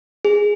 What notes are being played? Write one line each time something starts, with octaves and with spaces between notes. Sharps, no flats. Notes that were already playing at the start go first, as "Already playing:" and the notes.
G#4